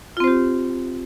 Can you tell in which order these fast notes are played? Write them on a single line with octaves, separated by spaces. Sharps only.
F4 C4 C5 G4